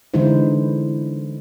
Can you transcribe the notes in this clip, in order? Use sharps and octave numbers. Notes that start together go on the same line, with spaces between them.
D3 E3 G#3 D#4 E4 C5